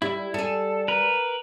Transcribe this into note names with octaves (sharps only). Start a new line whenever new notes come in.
G3 E4
G3 G#4 A4
A#4 B4